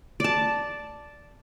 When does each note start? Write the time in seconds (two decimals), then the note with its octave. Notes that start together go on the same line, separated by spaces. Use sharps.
0.20 D5 A5